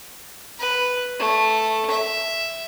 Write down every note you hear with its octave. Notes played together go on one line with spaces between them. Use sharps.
B4
A3
E5